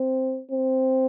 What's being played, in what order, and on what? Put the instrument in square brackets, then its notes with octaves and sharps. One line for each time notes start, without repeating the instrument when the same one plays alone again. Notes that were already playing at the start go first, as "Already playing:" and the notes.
Already playing: [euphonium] C4
C4